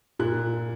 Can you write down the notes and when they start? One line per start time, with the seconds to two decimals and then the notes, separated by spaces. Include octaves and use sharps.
0.19 A#2 F#6